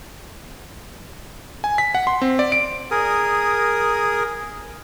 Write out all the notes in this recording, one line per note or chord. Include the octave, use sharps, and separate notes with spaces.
G#5
B6
F#5
C6
C4
D5
D7
G#4 A#4 D#6